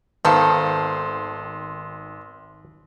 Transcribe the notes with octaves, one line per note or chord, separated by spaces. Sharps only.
G#1 D#3 B3 A4 C5 F5 A5 C6